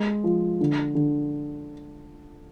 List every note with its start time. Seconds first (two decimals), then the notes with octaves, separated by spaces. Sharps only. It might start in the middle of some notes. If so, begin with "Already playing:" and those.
Already playing: G#3
0.24 F3
0.60 D3
0.95 D3